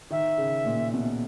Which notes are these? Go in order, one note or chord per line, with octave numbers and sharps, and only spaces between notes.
D#3 E5
C#3
A#2
B2